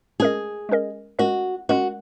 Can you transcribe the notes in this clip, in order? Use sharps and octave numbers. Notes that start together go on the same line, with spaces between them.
G#3 C#4 G#4 A#4 D#5
G#3 C#4 A#4 D#5
G#3 C#4 F#4 A#4 D#5
G#3 C#4 F#4 A#4 D#5